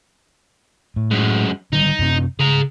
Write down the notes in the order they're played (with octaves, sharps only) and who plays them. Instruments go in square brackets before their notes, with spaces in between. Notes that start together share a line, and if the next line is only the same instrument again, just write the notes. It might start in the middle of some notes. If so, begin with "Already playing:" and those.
[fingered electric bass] A2
[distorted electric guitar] F#2 G#3
[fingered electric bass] D3 D#3 G3 [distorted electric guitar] D#4
[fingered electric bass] F#2 C3 C4
[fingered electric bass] C#3 [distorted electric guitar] G#4 A#5